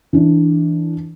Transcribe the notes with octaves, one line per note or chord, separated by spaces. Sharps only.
E3 D4